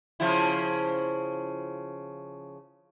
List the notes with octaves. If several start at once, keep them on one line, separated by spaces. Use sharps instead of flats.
C#3 F3 E4